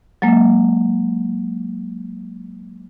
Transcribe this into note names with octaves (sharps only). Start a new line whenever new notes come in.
F#3 G#3 A#3